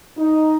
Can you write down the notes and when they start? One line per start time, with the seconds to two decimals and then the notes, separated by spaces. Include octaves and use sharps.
0.17 D#4